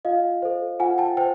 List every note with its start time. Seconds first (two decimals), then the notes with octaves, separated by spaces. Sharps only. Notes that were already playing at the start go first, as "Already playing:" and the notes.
0.05 F4 D#5 F5
0.42 A4 C5
0.80 F4 F#5 G#5
0.98 G5 A5
1.17 C5 G5 A5